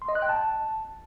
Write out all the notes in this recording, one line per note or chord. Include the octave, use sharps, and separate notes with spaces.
C6
D#5
F#6
G5
A5